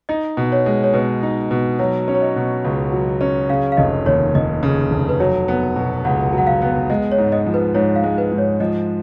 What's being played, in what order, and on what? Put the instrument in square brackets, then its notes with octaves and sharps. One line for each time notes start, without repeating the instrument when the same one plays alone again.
[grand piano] D#4 [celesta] D#5
[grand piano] B2
[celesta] C#5
[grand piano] G#3
[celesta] C#5
[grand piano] B2 [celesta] B4
[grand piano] D#4
B2
[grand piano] F#3 [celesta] C#5
[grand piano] C#4
[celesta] C#5
D#5
[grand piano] B2
C#2
F#3
C#4
[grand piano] C#3 [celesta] F5
[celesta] F5
[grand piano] F1 [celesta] D#5
[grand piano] D#2 [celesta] C#5
[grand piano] F1 [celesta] D#5
[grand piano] C#3
F1
[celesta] B4
[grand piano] F#3 [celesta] C#5
[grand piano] B3
B2
[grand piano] C#2 [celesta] F#5
[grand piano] F#3
[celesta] F#5
F5
[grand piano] B3
[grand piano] G#3 [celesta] D#5
[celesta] C#5
[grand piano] G#2
[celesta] D#5
[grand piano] F3
[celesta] B4
[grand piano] G#2 [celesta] C#5
[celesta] F5
[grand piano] G#3
[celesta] B4
[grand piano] G#2
[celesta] C#5
[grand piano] F3 [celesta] D#5